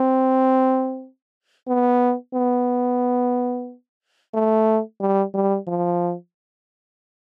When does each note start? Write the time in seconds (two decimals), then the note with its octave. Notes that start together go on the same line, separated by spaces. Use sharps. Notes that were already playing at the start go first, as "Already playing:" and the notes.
Already playing: C4
1.68 B3
2.35 B3
4.34 A3
5.00 G3
5.34 G3
5.67 F3